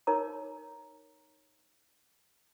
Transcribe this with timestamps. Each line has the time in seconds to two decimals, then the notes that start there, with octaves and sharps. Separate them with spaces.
0.07 D#4 A#4 C#5 A#5 D6